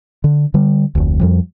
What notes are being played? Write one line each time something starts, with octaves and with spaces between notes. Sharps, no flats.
D3
D3 G3
F1 D2
F2 F3 G3